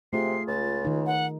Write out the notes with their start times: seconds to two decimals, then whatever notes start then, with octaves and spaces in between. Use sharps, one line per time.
0.13 C3 A3 F4 G#4 C7
0.48 C#2 A6
0.85 D#3 D#4
1.06 F#5